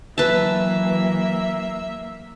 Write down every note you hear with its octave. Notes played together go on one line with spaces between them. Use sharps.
E3 F#3 A#3 B4 E5 A5